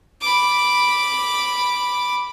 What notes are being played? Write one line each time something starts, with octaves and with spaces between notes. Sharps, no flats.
B5 D6